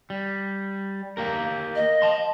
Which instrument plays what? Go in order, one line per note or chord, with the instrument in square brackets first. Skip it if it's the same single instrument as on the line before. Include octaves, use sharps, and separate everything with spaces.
[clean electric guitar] G3
A#3 G4 A#4
[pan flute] D#5
[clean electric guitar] A5 C6